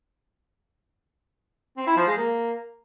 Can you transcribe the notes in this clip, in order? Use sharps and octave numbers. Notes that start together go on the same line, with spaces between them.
C4
E4
F3
G#3
A#3